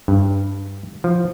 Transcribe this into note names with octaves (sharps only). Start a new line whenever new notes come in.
G2
F3